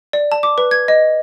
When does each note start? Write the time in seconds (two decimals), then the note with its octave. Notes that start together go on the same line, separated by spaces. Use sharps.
0.13 D5
0.32 A5
0.43 D6
0.58 B4
0.71 G#6
0.88 D#5